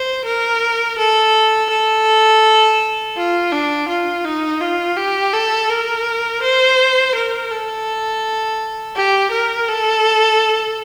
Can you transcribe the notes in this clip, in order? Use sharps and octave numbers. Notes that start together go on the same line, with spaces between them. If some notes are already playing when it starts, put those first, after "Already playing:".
Already playing: C5
A#4
A4
A4
F4
D4
F4
D#4
F4
G4
A4
A#4
C5
A#4
A4
G4
A#4
A4